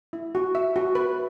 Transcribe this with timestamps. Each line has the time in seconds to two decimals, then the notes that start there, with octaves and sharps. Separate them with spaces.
0.13 E4
0.35 F#4
0.55 E5
0.76 F#4
0.95 B4